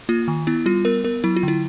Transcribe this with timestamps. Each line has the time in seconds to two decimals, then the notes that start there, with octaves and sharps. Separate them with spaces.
0.09 A#3 F4
0.28 D#3
0.47 B3 E4
0.66 G3 F4
0.85 B3 A#4
1.04 B3 A#4
1.24 F#3 E4
1.36 F4
1.43 D3 E4